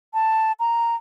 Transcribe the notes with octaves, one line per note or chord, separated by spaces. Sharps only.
A5
A#5